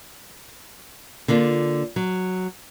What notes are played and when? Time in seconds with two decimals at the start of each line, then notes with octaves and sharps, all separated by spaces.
1.28 D3 A#3 D4 F4
1.96 F#3